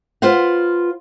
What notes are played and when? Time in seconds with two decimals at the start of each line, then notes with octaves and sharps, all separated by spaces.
0.22 F4 B4 C5 F5 F#5